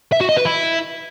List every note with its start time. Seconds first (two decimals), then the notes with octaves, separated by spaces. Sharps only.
0.12 E5
0.21 F#4
0.29 D#5
0.37 B4
0.45 E4